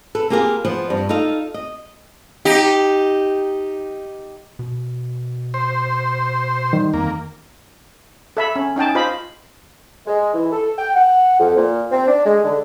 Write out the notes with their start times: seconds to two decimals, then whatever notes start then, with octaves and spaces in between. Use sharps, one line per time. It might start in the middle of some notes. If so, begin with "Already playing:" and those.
0.15 A4 B4
0.30 A#3 F4 G4 G#4 A#4
0.65 F3 B3
0.90 G2
1.09 D#4 F4 A4 F5
1.54 D#5
2.45 D#4 G4
4.59 B2
5.54 C5
6.73 D#3 G3
6.94 F2 A#3
8.37 A4 E5 B5
8.56 C#4
8.76 C#4 D#4 G5 A5
8.95 F4 C5 D#5 B5
10.07 G#3
10.34 E3
10.52 A4
10.78 G5
10.95 F#5
11.40 F2
11.56 A#2
11.91 C4
12.07 D4
12.26 G#3
12.44 D3